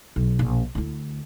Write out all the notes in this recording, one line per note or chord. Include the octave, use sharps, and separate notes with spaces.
B1
A#1 B2
D2 E4